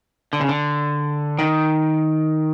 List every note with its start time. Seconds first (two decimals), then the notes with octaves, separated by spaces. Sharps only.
0.33 D3
0.41 C#3
0.49 D3
1.39 D#3